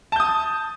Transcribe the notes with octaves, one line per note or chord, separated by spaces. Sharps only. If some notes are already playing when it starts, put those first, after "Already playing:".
A5 D#6 G6